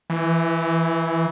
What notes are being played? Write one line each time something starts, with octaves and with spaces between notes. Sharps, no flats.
E3